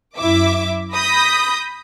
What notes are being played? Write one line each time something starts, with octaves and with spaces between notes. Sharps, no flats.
F#2 E4 E5 D6
B5 D#6 G6 A#6 B6